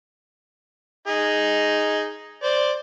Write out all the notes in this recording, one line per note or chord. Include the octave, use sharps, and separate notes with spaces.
D#4 G#4
C5 D5